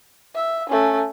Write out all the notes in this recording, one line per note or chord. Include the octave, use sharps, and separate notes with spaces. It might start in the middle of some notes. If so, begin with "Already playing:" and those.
E5
A3 C#4